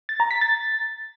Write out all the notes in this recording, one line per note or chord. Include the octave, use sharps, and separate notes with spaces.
A6
A#5
B6
A6